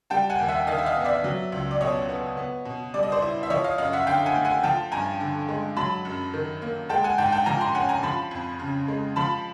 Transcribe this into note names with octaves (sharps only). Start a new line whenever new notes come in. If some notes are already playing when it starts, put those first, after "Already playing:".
G3 G5 A5
F#5 G#5
D#2
E5 F#5
D#3 D#5 F5
E5
D#5 F5
B3
D5 E5
F#3
C#2
D5
B2 C#5 D#5
B3
B3
B2
G3 D5
D#5
C5 D5
E4
E5
F3 C#5 D#5
D#5 F5
F#2 D#5 F5
E5 F#5
D3 F5 G5
F#5 G#5
A3
F#5 G#5
F3 G5 A5
G2 G#5 A#5
D3
G#3
F#3 A5 B5
F#2
D#3
A#3
G#3 G5 A5
F#5 G#5
G#2 G5 A5
G5 A5
F3 G#5 A#5
A#5 C6
C#4 F#5 G#5
G#5 A#5
F3 A5 B5
F2
C#3
G#3
F3 A5 B5